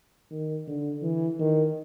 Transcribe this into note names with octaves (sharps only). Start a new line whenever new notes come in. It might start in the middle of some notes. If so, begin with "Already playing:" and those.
D#3
D3
E3
D#3